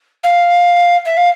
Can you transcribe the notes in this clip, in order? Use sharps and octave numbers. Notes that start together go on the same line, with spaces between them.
F5
E5
F5